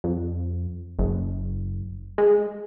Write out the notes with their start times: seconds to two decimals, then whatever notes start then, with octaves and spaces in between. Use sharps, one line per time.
0.04 F2
0.99 F#1
2.18 G#3